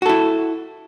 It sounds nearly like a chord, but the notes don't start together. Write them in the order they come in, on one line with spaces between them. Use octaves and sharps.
F#4 A4 E4